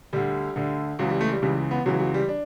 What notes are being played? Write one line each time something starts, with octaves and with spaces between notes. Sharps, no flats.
D2 D3 G3
D2 D3
C#2 C#3 E3 F#3
G3
A3
G3
C#2 C#3 E3 G3
B3
C#2 C#3 E3 F#3
F#3
G3
D4